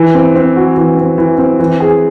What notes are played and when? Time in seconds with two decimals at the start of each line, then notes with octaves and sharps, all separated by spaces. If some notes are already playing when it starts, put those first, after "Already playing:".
Already playing: E3
0.15 C4
0.35 C4
0.56 F#4
0.78 E3
0.97 C4
1.18 E3
1.38 C4
1.59 E3
1.80 G#4